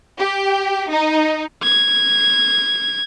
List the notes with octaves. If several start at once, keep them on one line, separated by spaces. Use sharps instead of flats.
G4
D#4
G#6